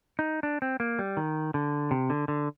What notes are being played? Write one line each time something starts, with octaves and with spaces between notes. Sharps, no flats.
D#4
D4
C4
A#3
G3
D#3
D3
C3
D3
D3